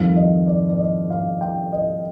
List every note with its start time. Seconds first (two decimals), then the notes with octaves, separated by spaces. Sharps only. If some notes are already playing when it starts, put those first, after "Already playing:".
Already playing: F2 D#3 G3 F5
0.16 D#5
0.47 D5
0.69 D5
0.79 D#5
1.10 F5
1.41 G5
1.72 D#5